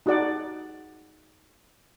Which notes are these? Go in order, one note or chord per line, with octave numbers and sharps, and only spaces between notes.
D#4 F#4 G#4 D5 F#5